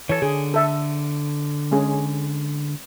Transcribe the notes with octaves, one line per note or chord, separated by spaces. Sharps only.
E3 A4 C#5
D3 G#4
A4 E5
G#3 C#4 G#4